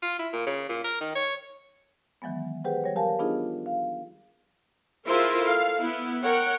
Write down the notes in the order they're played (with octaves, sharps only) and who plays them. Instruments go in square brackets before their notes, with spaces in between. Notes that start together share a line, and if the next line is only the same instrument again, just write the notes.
[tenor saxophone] F4
E4
A#2
C#3
A#2
A#4
D#3
C#5
[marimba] D#3 E3 F#3 G#3 B3
G4 G#4 B4 C5 F#5 G5
F3 G3 C#5
G4 A#4 F5 G#5 A5
B3 D4 D#4 F4 G#4 D#5
F5
[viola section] E4 F4 G#4 A#4 C5 E5
A4 F5
B3 E4
A#4 C#5 F#5 G5